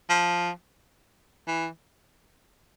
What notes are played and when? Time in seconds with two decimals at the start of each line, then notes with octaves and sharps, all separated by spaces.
0.09 F3
1.47 E3